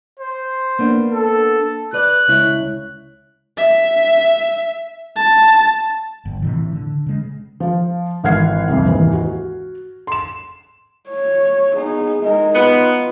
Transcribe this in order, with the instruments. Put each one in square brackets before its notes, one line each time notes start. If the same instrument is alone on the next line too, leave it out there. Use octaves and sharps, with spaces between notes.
[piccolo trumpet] C5
[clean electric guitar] A#3 B3 D4
[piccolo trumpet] A4
[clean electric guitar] B4 D5 [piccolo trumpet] F#6
[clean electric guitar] C#2 E4 C#5
[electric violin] E5
A5
[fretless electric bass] G1
A2 C3 E3
D3
C#3 G#3
[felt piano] F3 F4
G#1 E3 F#5 F6 G#6 C7
C2 F2
D#2 G#2 E3
F#4
C6 E7
[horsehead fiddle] C#5
[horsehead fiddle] B3 D#4 [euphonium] G#4
[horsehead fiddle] G#3 A#4 [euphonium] D#4
[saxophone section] B3 [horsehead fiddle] F4